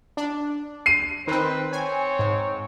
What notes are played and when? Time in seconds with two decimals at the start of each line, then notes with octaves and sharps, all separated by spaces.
0.17 D4
0.86 C7 D#7
1.27 D#3 C4 B4 C5
1.73 C4 C#5 G#5
2.19 G#2